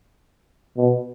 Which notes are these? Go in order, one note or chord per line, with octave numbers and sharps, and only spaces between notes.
B2